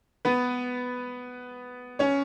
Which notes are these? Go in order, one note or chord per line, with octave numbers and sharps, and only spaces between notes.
B3 B4
C#4 C#5